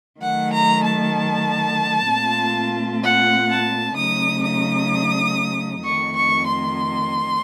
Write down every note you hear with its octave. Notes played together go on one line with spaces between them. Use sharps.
D#3 F#3 A3 F#5
A#5
A5
A#2 A3 C4 F4
F#5
A5
C#3 F#3 A3 D#4 D#6
D#6
F2 D#3 A3 C#6
C#6
C6